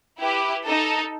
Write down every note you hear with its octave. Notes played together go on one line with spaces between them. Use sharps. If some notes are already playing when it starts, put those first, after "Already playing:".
E4 G4 B4
D#4 A4